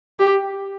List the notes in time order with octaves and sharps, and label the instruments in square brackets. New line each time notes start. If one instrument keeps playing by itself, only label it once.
[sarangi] G4